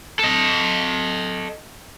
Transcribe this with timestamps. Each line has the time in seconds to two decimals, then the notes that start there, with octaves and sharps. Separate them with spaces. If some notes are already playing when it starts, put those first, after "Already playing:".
0.19 A4 D#5